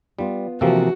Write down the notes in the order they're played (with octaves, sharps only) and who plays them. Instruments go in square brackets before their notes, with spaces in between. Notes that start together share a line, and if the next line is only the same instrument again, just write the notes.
[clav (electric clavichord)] G3 [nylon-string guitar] B3 F4
[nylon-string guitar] C3 E3 G#4 [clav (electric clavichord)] F3 A#3 A4 [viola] F#4